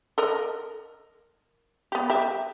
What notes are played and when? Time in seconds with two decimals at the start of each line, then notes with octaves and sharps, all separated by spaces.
0.18 A4 A#4 D#5
1.92 B3 G4
2.10 G4 E5